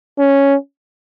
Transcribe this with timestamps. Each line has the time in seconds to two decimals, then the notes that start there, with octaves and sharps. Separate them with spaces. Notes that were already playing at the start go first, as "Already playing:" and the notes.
0.19 C#4